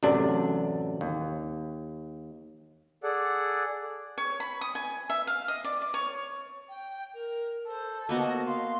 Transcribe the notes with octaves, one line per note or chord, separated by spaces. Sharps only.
A1 F#2 C3 D4
D#2
G#4 A4 D5 F#5
C#5
B5
D#6
G#5
E5
F5
D#5
D5
D5
C#5
G5
A#4
A4 C5
A#3 B3 F#4 D#5
F5 C6